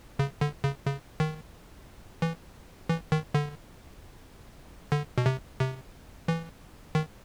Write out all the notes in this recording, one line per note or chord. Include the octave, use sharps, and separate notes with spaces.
C#3
D3
C#3
C#3
D#3
E3
E3
D#3
D3
D3
B2
C3
C3
E3
D#3